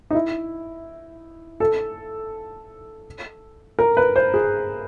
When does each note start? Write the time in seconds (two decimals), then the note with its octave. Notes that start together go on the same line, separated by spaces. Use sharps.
0.11 D#4
0.15 E4
1.60 A4
3.79 A#4
3.97 B4
4.16 C5
4.34 G#4